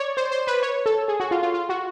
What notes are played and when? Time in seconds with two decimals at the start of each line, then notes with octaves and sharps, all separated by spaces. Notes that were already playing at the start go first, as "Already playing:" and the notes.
Already playing: C#5 D5
0.17 C5
0.31 C5
0.47 B4
0.62 C#5
0.86 A4
1.08 G#4
1.20 F#4
1.31 F4
1.43 F4
1.54 F4
1.69 F#4